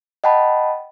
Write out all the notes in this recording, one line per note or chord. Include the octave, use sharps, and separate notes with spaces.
D#5 F#5 G5 A5 B5